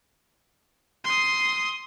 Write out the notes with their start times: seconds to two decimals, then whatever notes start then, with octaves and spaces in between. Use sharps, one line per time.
1.04 C6 D#6